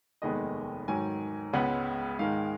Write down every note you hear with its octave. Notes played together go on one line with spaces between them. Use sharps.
F1 D#2 D#3 G#3 B3 D#5
G#2 D#3 F#3 G#5
C#2 C#3 G#3 B3 F#5
G#2 D#3 G#3 F5